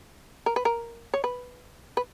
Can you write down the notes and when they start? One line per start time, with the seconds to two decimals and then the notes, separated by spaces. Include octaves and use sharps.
0.46 A#4
0.56 B4
0.65 A#4
1.14 C#5
1.24 B4
1.97 B4